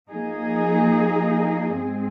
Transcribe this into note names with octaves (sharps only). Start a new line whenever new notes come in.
F3 A#3 D#4 G#4
G#2 G#3 C4 G#4